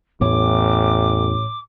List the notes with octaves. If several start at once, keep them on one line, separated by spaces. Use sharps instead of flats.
A1 E2 A2 E3 B3 C#5 D6